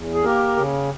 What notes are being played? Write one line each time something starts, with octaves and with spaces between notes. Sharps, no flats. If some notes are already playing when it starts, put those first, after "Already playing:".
Already playing: E2
G#4
A#3 G4 A#4
C#3